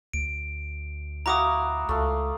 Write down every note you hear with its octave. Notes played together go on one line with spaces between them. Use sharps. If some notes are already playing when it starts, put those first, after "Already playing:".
D2 D7
E4 F#4 F5 A#5 D6 D#6
C#2 A3 F5